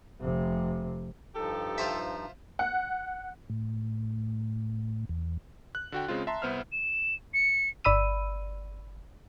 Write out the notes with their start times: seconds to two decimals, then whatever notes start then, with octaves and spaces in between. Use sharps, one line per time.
0.21 F1 C3
1.35 G2 F3 D#4 G4 A4
1.78 F4 C5 E5
2.59 F#5
3.50 A2
5.09 E2
5.75 F#6
5.92 D3 F#4 G5
6.08 C#3 G#3 C4 F4
6.27 E5 A5 A#5 C6
6.42 C2 B3 C5 E5 F6
6.72 E7
7.34 C#7
7.84 G1 D5 B5 E6 D#7